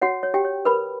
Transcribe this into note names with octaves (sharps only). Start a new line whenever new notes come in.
F#4 C#5 F#5
C#5
G4 G5
C#5
A#4 B4 B5